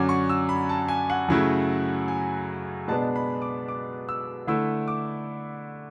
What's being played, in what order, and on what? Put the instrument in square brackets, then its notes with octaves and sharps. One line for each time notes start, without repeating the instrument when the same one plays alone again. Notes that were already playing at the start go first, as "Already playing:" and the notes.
Already playing: [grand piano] F#2 D3 F#3 C#4 D6
C#6
E6
B5
A5
G#5
F#5
F#2 C#3 F#3 A3 E4
G#5
B2 G#3 B3 D4 A5
B5
D6
D6
E6
D3 A3 E4 E6
D6